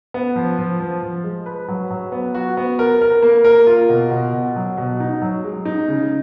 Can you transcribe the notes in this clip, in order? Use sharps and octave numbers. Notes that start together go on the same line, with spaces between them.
B3
F3
F3
F3
F3
G#3
B4
F#3
F#3
B3
F#4
B3
A#4
A#4
A#3
A#4
F4
B2
B2
B2
F#3
B2
D#4
F#3
G#3
D#4
C#3